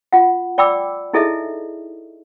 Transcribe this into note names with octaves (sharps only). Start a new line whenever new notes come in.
F4 F#5
D5 G5 B5 D6 E6
D#4 E4 G#4 A4 D#5 E5